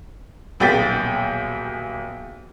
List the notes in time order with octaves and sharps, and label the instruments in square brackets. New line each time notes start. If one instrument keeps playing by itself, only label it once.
[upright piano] D#1 B1 G#4 G5 A6 B6